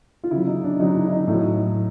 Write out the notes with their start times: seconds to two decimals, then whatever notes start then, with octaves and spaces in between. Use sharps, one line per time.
0.23 F4
0.31 C#3 F#3 E4
0.47 D#4
0.64 D4
0.80 C#3 F#3 D#4
0.96 E4
1.07 E4
1.12 D#4
1.28 A2 F#3